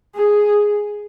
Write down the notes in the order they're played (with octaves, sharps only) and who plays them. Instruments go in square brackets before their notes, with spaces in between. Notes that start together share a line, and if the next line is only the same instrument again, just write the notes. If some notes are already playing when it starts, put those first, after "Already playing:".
[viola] G#4